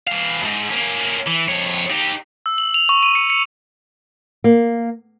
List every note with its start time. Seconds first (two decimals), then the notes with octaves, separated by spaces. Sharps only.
0.07 E3 F5
0.41 D#2 G#2
0.69 A#3 C#4
1.27 E3
1.48 F2 C#5
1.90 D#4 G4
2.46 E6
2.58 F#7
2.74 F7
2.89 C#6
3.03 D#7
3.15 C#7
3.30 C#7
4.44 A#3